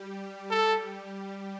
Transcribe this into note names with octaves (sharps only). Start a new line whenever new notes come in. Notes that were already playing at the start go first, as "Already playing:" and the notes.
Already playing: G3 G4
A4